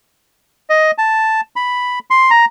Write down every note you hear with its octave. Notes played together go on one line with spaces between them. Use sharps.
D#5
A5
B5
C6
A#5